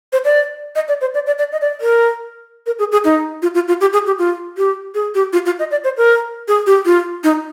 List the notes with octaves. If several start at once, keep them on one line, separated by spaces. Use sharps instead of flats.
C5
D5
D#5
D5
C5
D5
D5
D5
D#5
D5
A#4
A#4
G#4
G#4
D#4
F4
F4
F4
G4
G#4
G4
F4
G4
G#4
G4
F4
F4
D#5
D5
C5
A#4
G#4
G4
F4
D#4